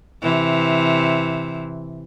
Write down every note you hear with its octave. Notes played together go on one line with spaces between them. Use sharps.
C3 E3